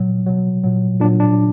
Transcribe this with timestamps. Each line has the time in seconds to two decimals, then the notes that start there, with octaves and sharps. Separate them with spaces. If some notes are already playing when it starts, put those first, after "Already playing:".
Already playing: A#2 F#3
0.26 B2 F#3
0.64 A#2 F#3
1.00 A#2 F#3 D4
1.20 D4